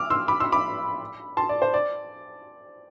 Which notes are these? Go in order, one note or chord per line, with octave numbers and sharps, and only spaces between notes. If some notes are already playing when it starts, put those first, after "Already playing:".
Already playing: D6 E6 F6
C6 E6
B5 D6
C6 E6
B5 D6
A5 C6
D5
C5
D5